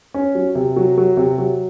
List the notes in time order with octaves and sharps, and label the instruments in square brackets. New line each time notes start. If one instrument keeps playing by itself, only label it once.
[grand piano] C#4
F#3
C3
F#3
F#3
C3
F#3